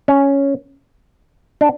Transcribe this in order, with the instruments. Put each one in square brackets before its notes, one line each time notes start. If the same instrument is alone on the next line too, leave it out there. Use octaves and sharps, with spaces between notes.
[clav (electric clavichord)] C#4
D4